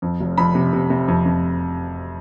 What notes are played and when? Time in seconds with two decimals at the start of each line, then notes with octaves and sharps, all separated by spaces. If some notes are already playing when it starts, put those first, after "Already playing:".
0.02 F2
0.20 F1
0.38 F2 B5
0.55 C3
0.73 C3
0.90 C3
1.08 F2
1.25 F2